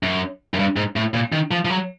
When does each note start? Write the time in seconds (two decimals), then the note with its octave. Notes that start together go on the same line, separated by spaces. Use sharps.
0.03 F#2
0.54 F#2
0.59 G2
0.76 G#2
0.96 A2
1.14 A#2
1.32 D#3
1.51 F3
1.65 F3
1.70 F#3